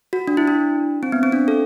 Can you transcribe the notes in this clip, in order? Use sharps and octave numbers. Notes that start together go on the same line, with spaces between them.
F#4
D4
E4
D4
C4
B3
C4
D4
A4